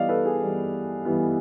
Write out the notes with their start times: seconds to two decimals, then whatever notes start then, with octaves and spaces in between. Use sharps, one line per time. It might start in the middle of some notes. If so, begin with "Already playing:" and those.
Already playing: E3 G3 B3 D5 D#5 F5
0.09 A4 B4
0.25 G#4
0.41 E3 G3 B3
1.05 E3 G3 B3